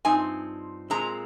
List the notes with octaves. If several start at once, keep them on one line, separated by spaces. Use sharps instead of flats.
G2 F3 C4 D#4 G#5
A#2 G#3 C4 A#5